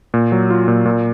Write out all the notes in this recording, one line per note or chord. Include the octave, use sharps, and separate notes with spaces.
A#2
F#3
F4
A#2
A#2